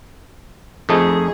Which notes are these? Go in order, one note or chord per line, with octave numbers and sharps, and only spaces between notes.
F2 A3 D#4 G#4